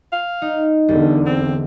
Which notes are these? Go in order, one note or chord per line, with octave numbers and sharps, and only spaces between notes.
F5
D#4
E1 E2 D3 G3
C4